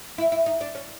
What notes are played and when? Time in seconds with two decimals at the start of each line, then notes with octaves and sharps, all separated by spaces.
0.18 E4
0.32 E4
0.46 D#4
0.61 D4
0.75 C#4